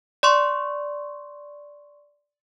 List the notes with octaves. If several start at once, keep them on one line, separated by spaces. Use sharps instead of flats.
D5 C6 C#6